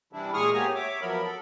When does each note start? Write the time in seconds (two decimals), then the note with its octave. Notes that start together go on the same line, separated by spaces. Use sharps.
0.13 C3 E3 G3 D4 E4
0.34 A#2 G#3 G#4 C#6 D#6 F6
0.53 A#3 B3 G4 C#5 G#5 A#5
0.75 C#5 E5 D6
1.02 F3 F#3 B3 A#4 B5
1.23 A4